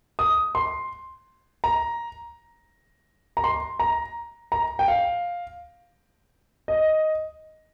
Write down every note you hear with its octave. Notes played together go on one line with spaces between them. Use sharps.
D#6
C6
A#5
A#5
C6
A#5
A#5
G5
F5
D#5